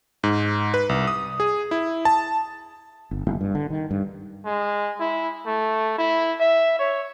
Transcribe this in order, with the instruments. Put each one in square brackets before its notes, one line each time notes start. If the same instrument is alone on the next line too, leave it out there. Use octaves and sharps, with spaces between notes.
[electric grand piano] G#2
B4
C2
D#6
G#4
E4
A5
[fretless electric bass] G1
F#1
G2
D3
D#3
G2
[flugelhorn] G#3
E4
A3
E4
E5
C#5